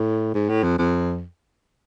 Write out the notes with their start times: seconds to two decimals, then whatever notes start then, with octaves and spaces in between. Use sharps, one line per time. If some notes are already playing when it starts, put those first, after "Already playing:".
Already playing: A2
0.34 G#2
0.49 A2
0.63 F2
0.79 F2